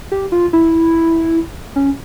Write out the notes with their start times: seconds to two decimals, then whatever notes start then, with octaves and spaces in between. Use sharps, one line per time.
0.12 G4
0.32 F4
0.53 E4
1.76 C#4